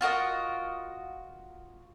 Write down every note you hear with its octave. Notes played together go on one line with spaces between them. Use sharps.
F4 F#4 A#4 D#5